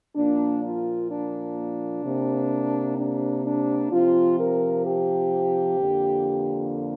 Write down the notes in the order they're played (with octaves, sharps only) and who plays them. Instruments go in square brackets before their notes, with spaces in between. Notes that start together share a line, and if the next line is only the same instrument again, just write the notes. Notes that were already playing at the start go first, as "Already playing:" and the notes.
[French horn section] A#2 F3 A#3 D4
F4
D4
C3 A#3
D4
D4
C3 F3 C4 F4
A#4
G4
F2 D3 A#3